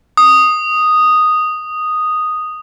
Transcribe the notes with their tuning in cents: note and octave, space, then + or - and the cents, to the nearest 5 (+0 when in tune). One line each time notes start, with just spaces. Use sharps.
D#6 -5